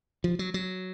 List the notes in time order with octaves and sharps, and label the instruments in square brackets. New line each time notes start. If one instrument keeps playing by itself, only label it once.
[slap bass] F3
F#3
F#3